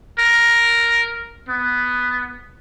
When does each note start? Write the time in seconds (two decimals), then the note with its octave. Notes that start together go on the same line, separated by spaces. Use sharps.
0.19 A#4
1.48 B3